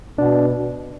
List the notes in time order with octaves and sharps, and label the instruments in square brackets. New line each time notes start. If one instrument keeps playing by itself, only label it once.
[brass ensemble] B2 [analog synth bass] D4